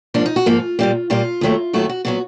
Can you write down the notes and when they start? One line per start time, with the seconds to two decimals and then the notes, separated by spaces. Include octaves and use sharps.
0.14 G#2 F3 A#3 D4
0.26 D#4
0.36 F#4
0.46 G#2 F3 A#3 F4
0.79 A#2 G3 A#3
1.10 A#2 G3 A#3 F4
1.41 D#2 D#3 F#3 A3
1.73 D#2 D#3 F#3 A3 F#4
1.89 F#4
2.05 A#2 F#3 B3 F#4